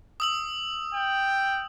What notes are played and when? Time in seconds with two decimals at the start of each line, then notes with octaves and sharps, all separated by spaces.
0.20 D#6 E6 F#7
0.94 G5